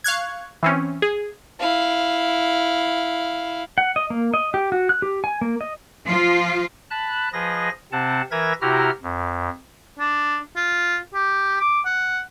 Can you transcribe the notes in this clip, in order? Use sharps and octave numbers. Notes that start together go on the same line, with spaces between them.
F5 C#6 F#6 G#6
E3 C4 C#4
G#4
E4 F5
F#5
D#5
A#3
D#5
G4
F#4
F#6
G4
G#5
A#3
D#5
F3 F4
A5 B5 F#6
F3 G#4 B4 D#5 A#6
C3 C4 F#5 A5
E3 A#4 B4 E5 G#6 A#6
C3 E4 F#4 G4 A#5 F6
F2
D4
F4
G4
D6
F#5